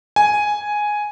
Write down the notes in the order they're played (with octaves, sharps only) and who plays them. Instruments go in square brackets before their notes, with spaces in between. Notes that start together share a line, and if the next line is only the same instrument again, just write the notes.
[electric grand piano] G#5